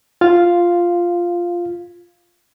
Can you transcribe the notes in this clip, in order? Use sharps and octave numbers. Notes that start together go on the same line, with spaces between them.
F4 F5